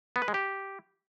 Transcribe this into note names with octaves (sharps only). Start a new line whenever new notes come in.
B3
B4
G#3
G4